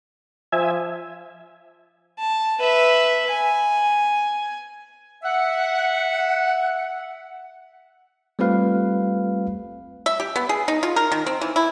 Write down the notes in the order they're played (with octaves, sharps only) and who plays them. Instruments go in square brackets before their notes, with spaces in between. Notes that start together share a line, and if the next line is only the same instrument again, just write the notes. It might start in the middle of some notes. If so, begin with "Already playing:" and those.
[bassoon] F3 [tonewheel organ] E5 G#5
[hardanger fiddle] A5
B4 E5
G#5
[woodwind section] E5 F#5
[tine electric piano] G3 A3 C4 F4 B4 F5
[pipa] E5
G4
B3
G#4
D#4
F4
A#4
D#3
C4
E3
E4